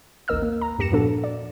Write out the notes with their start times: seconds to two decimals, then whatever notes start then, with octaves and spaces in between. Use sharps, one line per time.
0.28 A1 D#2 A#4 D#5 E6 F6
0.42 A#3
0.61 A#5
0.78 E2 G2 G4 A#6 C#7 E7
0.92 A#2 F3 B3 D4 F#4 A4
1.24 D5